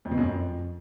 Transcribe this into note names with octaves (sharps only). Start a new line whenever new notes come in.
F2
B2
F#2
F2